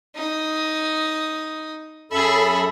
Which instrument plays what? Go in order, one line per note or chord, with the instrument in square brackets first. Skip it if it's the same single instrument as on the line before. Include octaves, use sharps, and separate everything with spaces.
[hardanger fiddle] D#4 D#6
[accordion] F#2 A4 B5 [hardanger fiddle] G#4 E5